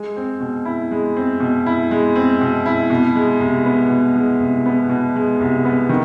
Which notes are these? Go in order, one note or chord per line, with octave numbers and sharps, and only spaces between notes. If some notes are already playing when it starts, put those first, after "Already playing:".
Already playing: G#3
C4
B2
E4
G#3
C4
B2
E4
G#3
C4
B2
E4
B2
G#3
C2
B3
B2
G#3
C2
B3
B2
G#3
C2
B3
D#3